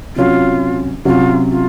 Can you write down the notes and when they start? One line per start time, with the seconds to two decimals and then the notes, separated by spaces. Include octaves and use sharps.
0.16 C3 F#3 C#4 F4 F#4
1.05 C3 F#3 C#4 F4 F#4
1.51 F4